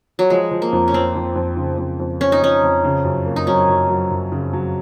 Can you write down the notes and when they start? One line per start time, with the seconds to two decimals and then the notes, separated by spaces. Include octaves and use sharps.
0.19 F#3
0.30 F3 G#3
0.51 F3
0.62 A#3
0.73 F2
0.88 C#4
0.93 F2 C4
1.15 F2
1.36 F2
1.57 C#3
1.78 F2
2.00 F2
2.21 F2 C#4
2.32 D#4
2.42 F2 C#4
2.63 F2
2.84 C#3
3.05 F#2
3.26 A#3
3.36 D#4
3.47 F#3 C#4
3.69 F#2
3.89 F#3
4.11 F#2
4.32 C#3
4.53 F#3